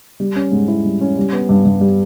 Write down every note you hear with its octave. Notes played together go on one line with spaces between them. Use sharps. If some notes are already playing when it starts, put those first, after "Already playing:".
G3
C#4
G#2
E4
G3
C#4
G3
B3
G2
G2
G3